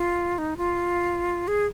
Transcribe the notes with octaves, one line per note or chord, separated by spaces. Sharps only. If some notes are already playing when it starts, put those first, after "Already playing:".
Already playing: F4
D#4
F4
G#4